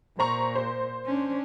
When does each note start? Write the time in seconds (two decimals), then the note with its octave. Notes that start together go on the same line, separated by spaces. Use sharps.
0.19 A#2 C5 A#5 C#6
0.55 C5
1.05 C#4 D4